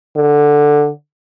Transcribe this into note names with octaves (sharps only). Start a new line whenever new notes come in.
D3